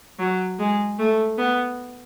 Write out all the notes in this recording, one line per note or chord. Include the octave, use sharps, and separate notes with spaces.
F#3
G#3
A3
B3